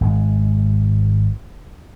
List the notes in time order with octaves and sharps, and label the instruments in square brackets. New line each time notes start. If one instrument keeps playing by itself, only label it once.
[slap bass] G#1 G#3